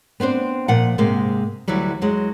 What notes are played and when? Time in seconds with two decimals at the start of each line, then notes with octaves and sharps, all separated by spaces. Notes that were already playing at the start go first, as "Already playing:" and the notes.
0.20 B3 C4 D4 C5
0.68 A#2 F3 F#5
0.98 G#2 C3 G#3 A#3
1.68 D2 E3 F#3 G3
2.01 E2 F#3 G#3